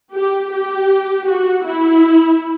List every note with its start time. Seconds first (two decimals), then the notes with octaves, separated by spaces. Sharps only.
0.13 G4
0.51 G4
1.27 F#4
1.65 E4